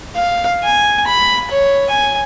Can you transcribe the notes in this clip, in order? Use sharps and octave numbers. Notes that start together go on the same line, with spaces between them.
F5
G#5
B5
C#5
G#5